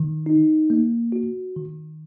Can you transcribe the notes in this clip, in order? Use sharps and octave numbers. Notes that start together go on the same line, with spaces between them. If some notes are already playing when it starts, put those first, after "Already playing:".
Already playing: D#3
D#4
A#3
F#4
D#3